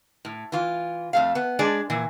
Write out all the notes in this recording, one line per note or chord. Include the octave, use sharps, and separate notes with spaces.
A2
E3 F4
F2 A3 F5
B3
G#3 D4 G#4 D5
A#2 E3